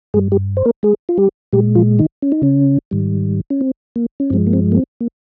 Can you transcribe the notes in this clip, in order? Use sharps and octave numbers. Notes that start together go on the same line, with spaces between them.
G2 G3 G#3 G#4
G3 G4
C5
A#3 A#4
G#3 G#4
F4
G3 G4
A#2 G3 G#3 G4
F3 F4
D#3 D#4
C#4
D#4
C#3 C#4
G#2 D#3 G3
C#4
C4
A#3
C#4
G2 F3 G#3 C4
A#3
C4
A#3
C4
A#3